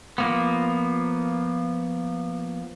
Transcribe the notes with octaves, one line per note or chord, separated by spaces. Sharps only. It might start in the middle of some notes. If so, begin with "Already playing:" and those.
F3 A#3 B3